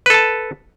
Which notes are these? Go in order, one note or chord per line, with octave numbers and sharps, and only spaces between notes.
A4 B4 A5